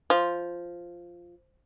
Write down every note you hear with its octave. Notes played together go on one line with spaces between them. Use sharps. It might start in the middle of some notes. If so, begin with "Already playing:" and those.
F3